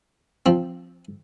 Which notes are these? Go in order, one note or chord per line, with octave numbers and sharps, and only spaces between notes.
F3 C4